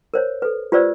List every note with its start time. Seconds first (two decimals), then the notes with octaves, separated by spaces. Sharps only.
0.14 A#4 C5 C#5
0.42 A4 B4
0.72 F4 G4 B4 C5 D5 E6